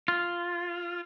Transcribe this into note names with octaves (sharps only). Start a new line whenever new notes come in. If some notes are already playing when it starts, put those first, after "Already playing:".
F4